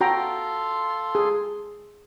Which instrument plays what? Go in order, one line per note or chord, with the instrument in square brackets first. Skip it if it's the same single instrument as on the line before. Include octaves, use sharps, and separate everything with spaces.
[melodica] F4 A4 C6 [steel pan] F#4 G5 A#5
[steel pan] G#4